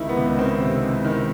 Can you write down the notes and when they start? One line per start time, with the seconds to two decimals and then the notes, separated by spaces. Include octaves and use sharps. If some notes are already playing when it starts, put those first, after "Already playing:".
Already playing: C#2 C3 D#3 D#4 E4
0.09 B3
0.17 C#2
0.38 D#3 C4
0.61 C3
0.82 C#2
1.05 D#3